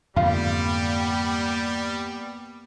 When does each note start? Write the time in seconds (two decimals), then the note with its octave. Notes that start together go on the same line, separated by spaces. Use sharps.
0.16 F2 G#2 D3 G3 A#3 B3 F4